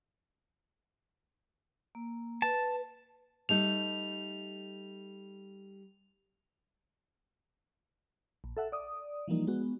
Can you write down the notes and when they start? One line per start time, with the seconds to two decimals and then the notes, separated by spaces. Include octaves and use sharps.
1.95 A#3
2.42 B4 A5
3.49 G3 A3 D#4 F7
8.44 A#1
8.57 A4 E5 F#5
8.72 D5 D#6
9.28 E3 F3 G3 A#3 D#4
9.47 G#3 B3 F#4